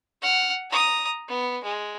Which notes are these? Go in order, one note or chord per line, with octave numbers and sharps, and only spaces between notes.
F#5 F6
A#5 D#6
B3
G#3